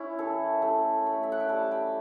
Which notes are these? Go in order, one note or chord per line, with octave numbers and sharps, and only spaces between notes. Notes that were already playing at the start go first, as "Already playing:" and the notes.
Already playing: C#4 E4
E3 A4
A3 A4
A3
E5
F#5
G5
G3 A5
G5